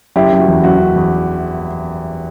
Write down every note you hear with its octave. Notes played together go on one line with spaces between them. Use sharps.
F#1 E4 G4
F#1
F#4
E2
F#1 F#4
F#1
E2